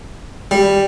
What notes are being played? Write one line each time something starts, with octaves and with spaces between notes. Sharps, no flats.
G3